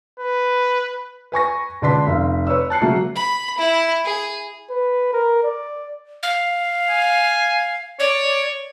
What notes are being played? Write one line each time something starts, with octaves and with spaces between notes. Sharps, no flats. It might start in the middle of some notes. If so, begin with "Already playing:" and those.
B4
B4 G#5 C#6 A#6
C#2 D3 D4 B4 C6 B6
F1 F5
B4 C#5 D5 E6
A5 F#6 C7 C#7
C#3 F#3 A3 A#3
B5
E4
G#4
B4
A#4
D5
F5
G#5
C#5 D5